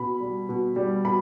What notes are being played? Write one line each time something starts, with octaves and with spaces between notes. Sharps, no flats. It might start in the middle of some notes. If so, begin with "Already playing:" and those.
Already playing: B2 B5
G3
B2
G3
B2 B5